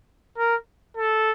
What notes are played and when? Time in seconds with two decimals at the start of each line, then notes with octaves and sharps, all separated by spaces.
0.38 A#4
0.97 A4